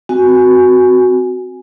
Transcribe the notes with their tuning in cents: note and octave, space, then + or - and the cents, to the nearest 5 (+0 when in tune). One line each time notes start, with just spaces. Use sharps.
C4 -25 F#4 +0 G#5 +0